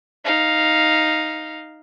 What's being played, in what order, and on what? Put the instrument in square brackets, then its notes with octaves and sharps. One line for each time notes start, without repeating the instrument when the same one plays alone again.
[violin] D#4 F5